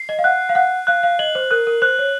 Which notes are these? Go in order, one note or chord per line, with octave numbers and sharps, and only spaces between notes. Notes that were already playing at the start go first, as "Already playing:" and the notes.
Already playing: C7
D#5
F5
F#5 F#6
F5
F#5 F#6
F5 F#6
F5
D#5 F#7
C5
A#4 F#6
A#4
C5 F#6
C#5